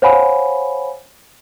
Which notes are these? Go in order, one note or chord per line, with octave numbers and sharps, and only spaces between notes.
C5 C#5 F5 F#5 G#5 B5